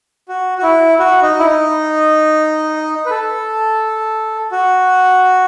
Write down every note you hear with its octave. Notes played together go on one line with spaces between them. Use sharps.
F#4
F#4
E4
F#4
D#4
E4
D#4
B4
A4
F#4